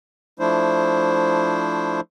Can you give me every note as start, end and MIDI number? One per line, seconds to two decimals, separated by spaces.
0.39 2.00 53
0.39 2.00 57
0.39 2.00 62
0.39 2.00 64
0.39 2.00 72